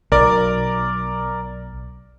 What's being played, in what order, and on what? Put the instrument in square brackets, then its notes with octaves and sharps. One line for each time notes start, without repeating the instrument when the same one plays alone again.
[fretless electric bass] B1 [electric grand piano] A#4 D5